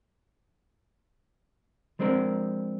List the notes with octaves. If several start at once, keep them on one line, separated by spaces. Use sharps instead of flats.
F3 G#3 C4 D4 A#4